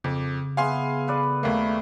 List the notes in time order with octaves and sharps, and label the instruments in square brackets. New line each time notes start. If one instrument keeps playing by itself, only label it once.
[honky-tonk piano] F2 [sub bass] C#3 [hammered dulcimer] D6
[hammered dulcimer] B3 G#4 E5 [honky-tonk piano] F5 G#5 C6
[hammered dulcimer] A4 B4 D5
[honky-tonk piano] D#2 A#3 [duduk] A3